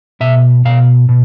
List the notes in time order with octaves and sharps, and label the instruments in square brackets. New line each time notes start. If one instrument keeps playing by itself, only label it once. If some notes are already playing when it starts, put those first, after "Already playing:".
[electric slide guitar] B2 E5
B2 F5
B2